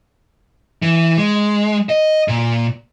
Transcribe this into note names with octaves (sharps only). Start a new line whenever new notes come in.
E3
G#3
D#5
A#2